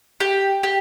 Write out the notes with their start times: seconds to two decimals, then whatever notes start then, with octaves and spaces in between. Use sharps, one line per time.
0.20 G4
0.63 G4